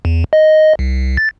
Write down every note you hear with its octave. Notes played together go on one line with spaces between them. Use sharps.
E2
D#5
C2
A6